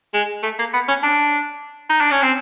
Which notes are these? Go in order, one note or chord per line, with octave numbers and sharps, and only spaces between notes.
G#3
A3
A#3
B3
C#4
D4
D#4
D4
C#4
C4